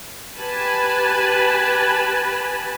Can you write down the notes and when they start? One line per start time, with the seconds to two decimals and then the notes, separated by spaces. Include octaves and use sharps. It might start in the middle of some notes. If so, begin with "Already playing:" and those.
0.37 G4 B4 G#5 A5 B5